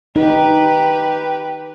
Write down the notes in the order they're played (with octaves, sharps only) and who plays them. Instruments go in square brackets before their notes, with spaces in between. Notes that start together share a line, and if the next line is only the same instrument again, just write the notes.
[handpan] D#4 [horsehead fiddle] G4 B4